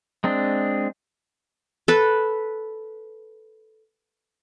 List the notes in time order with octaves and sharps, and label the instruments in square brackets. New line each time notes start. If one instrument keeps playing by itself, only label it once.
[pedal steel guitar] G#3 C4 D4
[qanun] A4 B4